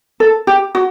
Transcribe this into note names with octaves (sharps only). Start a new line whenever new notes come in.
A4
G4
F#4